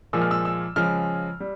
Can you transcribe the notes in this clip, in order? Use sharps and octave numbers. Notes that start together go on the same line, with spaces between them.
A#2 F3 G#3 E6
F6
E6
E6
C#3 F3 G#3 F6
G3